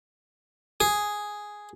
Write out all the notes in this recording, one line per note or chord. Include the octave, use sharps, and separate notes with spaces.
G#4